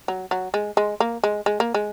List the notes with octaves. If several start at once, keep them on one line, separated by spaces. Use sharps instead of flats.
F#3
F#3
G#3
G#3
A#3
G#3
G#3
A#3
G#3